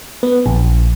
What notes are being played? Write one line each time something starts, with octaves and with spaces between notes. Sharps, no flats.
B3
A#1